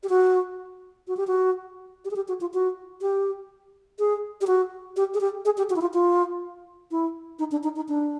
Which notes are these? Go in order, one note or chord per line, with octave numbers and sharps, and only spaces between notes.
G4
F#4
F#4
G4
F#4
G4
G#4
G4
F#4
F4
F#4
G4
G#4
G4
F#4
G4
G#4
G4
G#4
G4
F#4
E4
F4
F4
E4
D#4
D4
D#4
D#4
D4